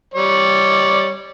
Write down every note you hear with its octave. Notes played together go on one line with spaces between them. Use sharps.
G3 C#5 D5